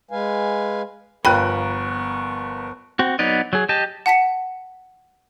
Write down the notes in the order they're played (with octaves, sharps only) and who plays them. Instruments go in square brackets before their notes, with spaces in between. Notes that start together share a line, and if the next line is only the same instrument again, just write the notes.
[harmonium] G#3 B4 F5 G#5
[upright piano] G1 F#6 [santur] F3 A#4 [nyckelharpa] B3 C#6 [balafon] G5 B5
[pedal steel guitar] C4 F#4
F#3 B3 D#4 D5 D#5
F#3 G#4
G4 D#5 A5
[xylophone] F#5 A5 B6 C#7